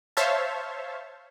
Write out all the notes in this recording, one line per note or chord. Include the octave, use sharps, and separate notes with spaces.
C5 C#5 E5 F5 A5